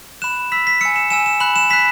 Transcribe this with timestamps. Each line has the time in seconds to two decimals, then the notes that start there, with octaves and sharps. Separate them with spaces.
0.22 B5 F#6 E7
0.52 B5 E6 B6
0.67 B6
0.81 G#5 E6 C#7
0.96 E7
1.10 G#5 E6 E7
1.26 E7
1.40 B5 F#6 F#7
1.56 E7
1.70 B5 F#6 B6